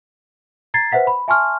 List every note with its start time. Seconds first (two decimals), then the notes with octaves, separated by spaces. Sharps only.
0.74 A#5 G#6 A6 C7
0.92 B4 C5 E5 F#5 B6
1.07 B5
1.28 E5 G#5 A5 C6 C#6 F6